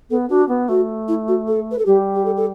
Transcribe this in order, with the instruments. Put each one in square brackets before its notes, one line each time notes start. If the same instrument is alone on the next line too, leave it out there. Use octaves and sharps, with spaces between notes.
[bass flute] B3 [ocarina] A4
[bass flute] D4 [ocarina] F#4
[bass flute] B3
[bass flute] A3 [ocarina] F#4
[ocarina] E4
F#4
A4
B4
A4
[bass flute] G3 [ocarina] G4
[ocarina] G4
A4
A4